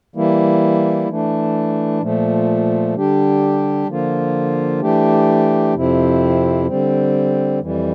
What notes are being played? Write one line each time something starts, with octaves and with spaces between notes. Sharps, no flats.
E3 G3 A#3 E4
E3 A3 D4
A#2 F3 A3
D3 G3 D4 G4
D3 F3 A#3 F4
E3 A3 D4 G4
F2 C3 F3 C4 E4
D3 G3 C4
F2 E3 G3